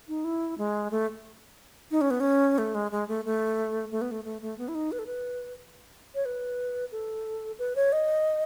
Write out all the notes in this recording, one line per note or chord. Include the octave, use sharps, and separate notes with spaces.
D#4
E4
G#3
A3
D#4
C#4
B3
C#4
A3
G#3
G#3
A3
A3
A3
B3
A3
A3
A3
B3
E4
D#4
B4
A4
B4
C#5
B4
A4
B4
C#5
D#5